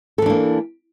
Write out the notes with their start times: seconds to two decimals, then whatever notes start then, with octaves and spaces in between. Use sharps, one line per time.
0.18 A4
0.22 E3
0.26 D4
0.30 A#3